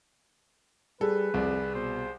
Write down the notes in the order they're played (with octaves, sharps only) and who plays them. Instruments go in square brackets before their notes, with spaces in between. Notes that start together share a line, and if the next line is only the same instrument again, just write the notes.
[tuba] G3 [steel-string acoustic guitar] G#4 [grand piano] A4 [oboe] B4
[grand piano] C2 D5 [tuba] F2
[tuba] B2 [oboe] C5